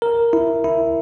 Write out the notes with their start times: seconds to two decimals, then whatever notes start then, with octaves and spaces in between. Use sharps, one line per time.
0.02 A#4
0.33 E4
0.64 E4